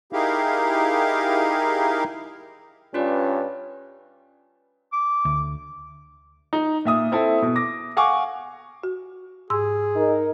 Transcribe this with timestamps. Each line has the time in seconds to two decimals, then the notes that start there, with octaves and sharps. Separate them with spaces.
0.13 D#4 E4 G4 G#4 A#4 F5
2.94 G2 C#4 F4 B4 D5
4.93 D6
5.25 D2
6.53 D#4
6.85 A#2 E5 D#6
7.12 C4 E4 A4
7.42 B2
7.56 D6 A#6
7.97 F5 F#5 G#5 C#6 D6
8.84 F#4
9.50 G#2 G#4 C6 E6
9.96 D#4 A#4